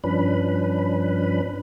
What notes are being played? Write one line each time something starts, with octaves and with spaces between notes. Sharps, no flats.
G2 F3 C#4 D4 B4 B5